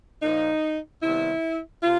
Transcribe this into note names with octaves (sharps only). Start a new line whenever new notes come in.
A#2 F3 A#3 D#4
C3 D#3 G3 B3 E4
C3 F4